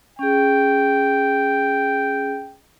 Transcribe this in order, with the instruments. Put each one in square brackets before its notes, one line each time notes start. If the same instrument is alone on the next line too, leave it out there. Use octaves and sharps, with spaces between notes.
[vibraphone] C#4 G#4 [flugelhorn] G5